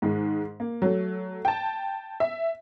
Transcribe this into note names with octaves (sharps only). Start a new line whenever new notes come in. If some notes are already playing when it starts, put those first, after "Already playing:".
G#2 D#3 G#3
A#3
F#3 A3
G5 A5
E5